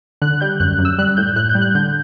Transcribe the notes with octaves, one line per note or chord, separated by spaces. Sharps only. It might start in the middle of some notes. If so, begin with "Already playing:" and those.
D3 F#6
G3 G6
F#2 F#6
F#2
E6
G3 F#6
A2 G6
A2 F#6
G6
G3
F#6
D3 G6